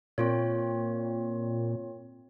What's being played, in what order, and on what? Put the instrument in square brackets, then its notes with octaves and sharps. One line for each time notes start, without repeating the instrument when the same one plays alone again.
[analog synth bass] A#2 [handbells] C4 F4 C#5